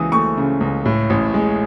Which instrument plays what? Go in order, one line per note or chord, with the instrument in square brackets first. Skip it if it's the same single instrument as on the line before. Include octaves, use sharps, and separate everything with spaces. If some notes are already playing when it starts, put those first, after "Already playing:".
Already playing: [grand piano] C#2 C#3 E3 D#6
A3 C#6
C#3
C#2
A2
A1
G#3